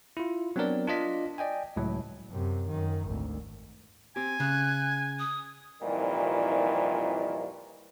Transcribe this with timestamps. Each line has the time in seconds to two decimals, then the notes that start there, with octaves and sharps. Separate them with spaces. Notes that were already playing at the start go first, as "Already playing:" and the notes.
0.17 E4 F4
0.56 F#3 B3 C4 D4 A#4 D5
0.87 D4 F4 D#5 B6
1.38 D5 D#5 G5 G#5
1.76 C#2 A2 F#3
2.31 F#2 C3
2.68 F#2 D#3
3.07 G#1 D2
4.16 C4 G4 G#5
4.40 C#3 F#6
5.19 D#6
5.82 C2 F2 A#2 D#3 E3 G3